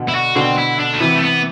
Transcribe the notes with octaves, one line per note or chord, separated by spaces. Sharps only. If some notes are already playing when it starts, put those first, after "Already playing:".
Already playing: B2 D3
E4
F#4
B2 D3 C4
E4
D4
A3
C3 E3 B3
A3
B3